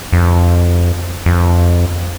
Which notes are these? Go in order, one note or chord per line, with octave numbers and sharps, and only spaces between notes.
F2
F2